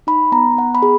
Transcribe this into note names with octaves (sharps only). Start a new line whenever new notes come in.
D#4 B5
B3 A#5
B3 F#5
B5
G#4